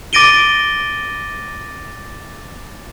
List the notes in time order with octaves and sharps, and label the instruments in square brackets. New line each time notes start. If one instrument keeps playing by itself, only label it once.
[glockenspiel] D6 A6 A#6 D7 D#7 G7